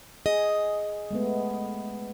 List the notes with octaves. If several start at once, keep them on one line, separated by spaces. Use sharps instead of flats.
G#4 D#5
G#3 A3 B3